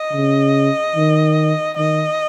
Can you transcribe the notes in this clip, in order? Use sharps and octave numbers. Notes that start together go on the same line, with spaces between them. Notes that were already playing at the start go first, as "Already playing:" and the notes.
Already playing: D#5
C#3
D#3
D#3 D#5